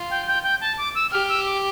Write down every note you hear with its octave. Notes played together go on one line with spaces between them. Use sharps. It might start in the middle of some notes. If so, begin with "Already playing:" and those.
Already playing: F4
G5
G5
G5
A5
D6
E6
G4 F6
E6
D6